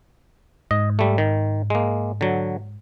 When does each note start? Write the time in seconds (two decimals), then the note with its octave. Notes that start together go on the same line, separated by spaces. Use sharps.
0.71 G#2 D#5
0.99 G3 A3
1.18 D#3
1.70 G#3 A#3
2.21 D3 F#3